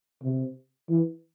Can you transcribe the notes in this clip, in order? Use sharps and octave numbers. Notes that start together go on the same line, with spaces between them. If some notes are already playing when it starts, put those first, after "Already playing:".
C3
E3